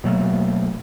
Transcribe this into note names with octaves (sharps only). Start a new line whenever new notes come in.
B2 F#3 A3 A#3